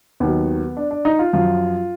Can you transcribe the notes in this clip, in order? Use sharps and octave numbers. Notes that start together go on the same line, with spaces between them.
D#2 D#3 F#3 B3
D4
D4
D#4
F4
F#2 F3 F4